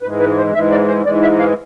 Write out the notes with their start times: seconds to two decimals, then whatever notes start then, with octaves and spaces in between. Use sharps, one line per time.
0.02 G#2 E3 G#3 B4
0.20 B4
0.38 C5
0.54 G#2 E3 G#3 E5
0.71 D5
0.88 C5
1.06 G#2 E3 G#3 D5
1.22 E5
1.39 F5